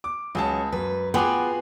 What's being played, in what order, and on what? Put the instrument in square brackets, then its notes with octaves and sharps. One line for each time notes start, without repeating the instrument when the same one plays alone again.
[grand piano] D6
[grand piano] C#2 G#4 A5 [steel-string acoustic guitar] F#3 C#4 C#5
[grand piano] F#2 [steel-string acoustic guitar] B4
[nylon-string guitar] B3 [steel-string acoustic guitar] F4 F#4 G#4 [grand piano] G5 G#5 D6